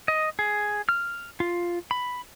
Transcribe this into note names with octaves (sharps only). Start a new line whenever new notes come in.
D#5
G#4
F6
F4
B5